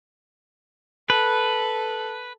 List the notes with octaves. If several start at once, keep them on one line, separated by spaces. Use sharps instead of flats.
A4 B4